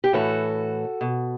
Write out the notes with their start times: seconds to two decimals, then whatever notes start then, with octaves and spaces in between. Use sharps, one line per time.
0.04 G4
0.13 A2 E3 F#4 A4
1.01 B2